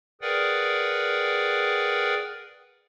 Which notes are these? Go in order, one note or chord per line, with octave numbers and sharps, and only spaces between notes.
G#4 A#4 B4 D5 F#5 G5